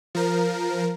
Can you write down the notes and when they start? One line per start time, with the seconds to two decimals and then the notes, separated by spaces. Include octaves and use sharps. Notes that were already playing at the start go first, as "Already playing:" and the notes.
0.15 F3 A#4